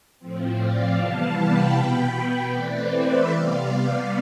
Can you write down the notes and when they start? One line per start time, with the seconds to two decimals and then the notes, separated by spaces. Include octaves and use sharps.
0.19 A2 F3 C4
0.58 D5 F5
0.96 C3 E3 G3 B3 F5 A5
1.35 G5 B5
1.74 B2 B3 G5 B5
2.51 E3 A3 C4 B4 D5
2.91 C5 E5
3.29 C3 G3 B3 D5 F5